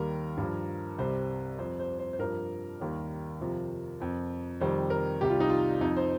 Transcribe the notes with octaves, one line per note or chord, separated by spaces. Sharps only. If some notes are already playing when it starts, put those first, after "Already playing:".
Already playing: D#2 D#3 G3 A#4
G2
F3
C2 C3 G3 C5
F2 F3 C5
C5
C5
C5
G2 F3 A#4
D#2 D#3 G3
F2 C3 F3
F2 F3
F2 C3 D#3 G3 C5
A#4
C2 C3 G3 G4
F4
D#4
F4
F2 F3 D#4
C5